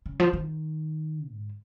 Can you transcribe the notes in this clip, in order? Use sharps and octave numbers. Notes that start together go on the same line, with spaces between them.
C#3
F3
D#3
G#2